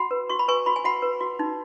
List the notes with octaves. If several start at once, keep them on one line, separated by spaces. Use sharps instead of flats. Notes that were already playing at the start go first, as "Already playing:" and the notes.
Already playing: F#4 F#5 B5
B4
F#4 C#6
B5
B4 G#5 C#6
F#4 B5
G#5
F#4 F#5 B5
B4
F#4
D#4